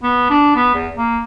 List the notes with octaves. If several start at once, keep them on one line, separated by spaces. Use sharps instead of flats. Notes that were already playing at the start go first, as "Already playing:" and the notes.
B3
D4
B3
E2
A#3